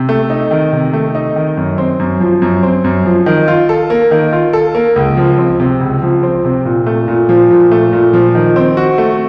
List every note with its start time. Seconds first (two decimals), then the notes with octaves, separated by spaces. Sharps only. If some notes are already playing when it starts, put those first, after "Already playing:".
Already playing: C3
0.09 A3
0.30 D#4
0.51 D#3
0.73 C3
0.93 A3
1.15 D#4
1.36 D#3
1.57 F#2
1.78 C4
2.00 F#2
2.20 F3
2.42 F#2
2.63 C4
2.84 F#2
3.06 F3
3.26 D#3
3.48 F4
3.69 A4
3.90 A#3
4.11 D#3
4.33 F4
4.53 A4
4.75 A#3
4.96 C#2
5.17 F3
5.38 C4
5.60 C3
5.81 C#2
6.02 F3
6.23 C4
6.45 C3
6.65 A#2
6.86 A3
7.08 A#2
7.29 F3
7.50 A#2
7.71 A3
7.93 A#2
8.13 F3
8.35 D#3
8.56 C4
8.77 F#4
8.98 A3